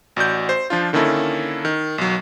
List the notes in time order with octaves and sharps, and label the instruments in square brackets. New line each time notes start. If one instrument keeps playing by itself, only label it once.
[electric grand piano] A1 F#4 D5 G6
C5
F3 D4 F4
D3 D#3 A#3 C#4 E4 A4
D#3
B1 F#3